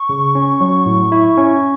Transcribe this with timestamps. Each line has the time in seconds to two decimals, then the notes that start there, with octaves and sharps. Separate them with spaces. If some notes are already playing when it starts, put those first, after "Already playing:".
Already playing: C#6
0.09 C#3
0.35 C#4
0.60 F#3
0.86 A2
1.12 E4
1.37 C#4